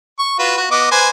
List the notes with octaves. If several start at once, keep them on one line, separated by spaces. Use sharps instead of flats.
C#6
F4 F#4 B4
F#4
B3 D#5 D6
B4 C5 G#5